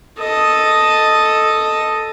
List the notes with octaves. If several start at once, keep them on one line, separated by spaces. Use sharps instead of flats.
A4 D#5